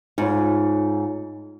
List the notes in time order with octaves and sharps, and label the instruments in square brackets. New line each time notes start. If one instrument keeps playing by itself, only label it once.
[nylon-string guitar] G#2 [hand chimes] D#4 F4 C#5